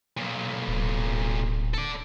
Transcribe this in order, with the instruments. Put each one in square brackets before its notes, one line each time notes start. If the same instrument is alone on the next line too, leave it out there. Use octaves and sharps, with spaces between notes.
[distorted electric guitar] B1 A#2
[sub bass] D1
[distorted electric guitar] A4 D5